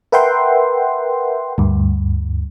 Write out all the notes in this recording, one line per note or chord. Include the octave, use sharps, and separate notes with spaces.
A#4 B4 E5 F#5 G5 C6
D2 G2